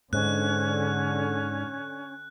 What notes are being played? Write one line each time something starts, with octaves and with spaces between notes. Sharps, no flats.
G#2 D3 C#4 F#6